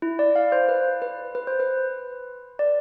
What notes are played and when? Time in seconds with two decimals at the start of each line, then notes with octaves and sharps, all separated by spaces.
0.02 E4
0.19 D5
0.36 F5
0.52 C5
0.69 B4
1.02 B4
1.35 B4
1.47 C5
1.60 B4
2.59 D5